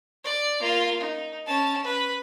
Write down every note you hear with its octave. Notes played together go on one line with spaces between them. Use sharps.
D5
A#3 F4
D#4
C#4 A5
B4